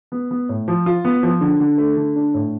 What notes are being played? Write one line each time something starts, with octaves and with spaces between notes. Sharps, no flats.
B3
B3
A2
F3
F4
B3
F3
D3
D3
A3
D3
D4
A2